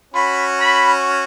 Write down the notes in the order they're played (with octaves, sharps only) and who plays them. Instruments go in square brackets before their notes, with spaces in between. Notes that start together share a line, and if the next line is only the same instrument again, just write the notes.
[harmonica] C#4 F#4 [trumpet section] B5
[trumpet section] B5